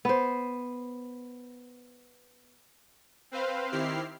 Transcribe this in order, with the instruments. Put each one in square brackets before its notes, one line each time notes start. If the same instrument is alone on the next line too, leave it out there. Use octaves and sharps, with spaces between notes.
[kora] B3 C5
[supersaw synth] C4 B4 C5 F5
D#3 C4 E4 G4 F6 C7